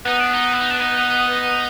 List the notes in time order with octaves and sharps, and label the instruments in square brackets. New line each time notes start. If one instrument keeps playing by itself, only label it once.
[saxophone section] B3 [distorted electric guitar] D#4
[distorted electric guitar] D4
D#4
E4
D#4
D4
D#4